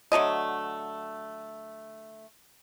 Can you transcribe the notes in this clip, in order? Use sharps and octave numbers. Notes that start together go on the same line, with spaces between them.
D3 F#3 A3 D#5